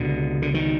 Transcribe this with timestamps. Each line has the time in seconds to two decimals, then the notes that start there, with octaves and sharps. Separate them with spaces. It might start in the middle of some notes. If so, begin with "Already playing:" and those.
Already playing: C#2 B2 D3
0.42 D3
0.54 D#3